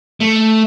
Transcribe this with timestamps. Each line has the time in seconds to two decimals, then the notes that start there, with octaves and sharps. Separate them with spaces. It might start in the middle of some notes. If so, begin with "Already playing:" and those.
0.20 A3